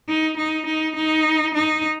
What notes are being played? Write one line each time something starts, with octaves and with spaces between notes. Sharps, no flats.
D#4
D#4
D#4
D#4
D#4